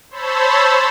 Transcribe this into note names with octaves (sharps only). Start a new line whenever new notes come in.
C5 C#5 A5 B5 E6